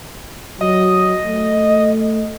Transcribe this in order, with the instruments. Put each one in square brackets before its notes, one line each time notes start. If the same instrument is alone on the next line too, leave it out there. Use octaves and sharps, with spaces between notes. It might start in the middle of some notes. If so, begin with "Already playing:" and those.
[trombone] F#3 [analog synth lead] D#5
[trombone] A3